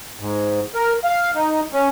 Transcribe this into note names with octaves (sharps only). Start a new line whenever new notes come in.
G#2
A#4
F5
D#4
C#4